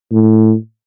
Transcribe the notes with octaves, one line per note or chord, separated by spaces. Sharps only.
A2